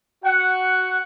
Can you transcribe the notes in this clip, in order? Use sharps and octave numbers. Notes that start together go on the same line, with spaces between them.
F#4 F#5